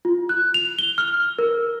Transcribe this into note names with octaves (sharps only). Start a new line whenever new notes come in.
F4
F#6
F7
G7
F6
A#4